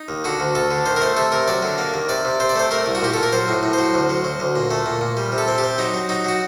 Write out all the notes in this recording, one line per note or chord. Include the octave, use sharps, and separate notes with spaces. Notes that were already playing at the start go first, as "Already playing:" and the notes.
Already playing: D#4
D#2
D3 F#4
D2
D2 A4
D3
D#3 C5
A#4
A3 C5
C3 A4
C3 A#4
F#3 D5
D3
A#3
D#2
C3 D5
C3
C3 C5
D5
A3 C5
A3 A#4
C2
F#4
A#2 G4
A#2 A4
A#4
F#3 C5
A2
A2
F#3 C5
D2
F#3
F#3
D2
A#2
A3
A#2
A#2
G3
C3
A4
C4
G4
C4
F#3 D#4
F#3
F#3 D#4
F#3 F#4